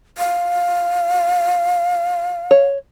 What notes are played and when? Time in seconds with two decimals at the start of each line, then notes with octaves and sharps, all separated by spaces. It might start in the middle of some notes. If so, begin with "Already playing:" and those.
0.18 F5
2.51 C#5